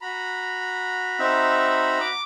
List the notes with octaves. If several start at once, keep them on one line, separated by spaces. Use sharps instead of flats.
F#4 A#5 B5
C4 D#4 E5
D6